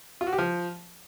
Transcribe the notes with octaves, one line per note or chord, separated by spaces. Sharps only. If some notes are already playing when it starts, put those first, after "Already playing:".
F4
F#4
G4
F3